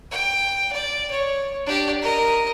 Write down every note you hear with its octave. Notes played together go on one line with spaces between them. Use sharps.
G5
D5
C#5
D4 G4
A#4 D#5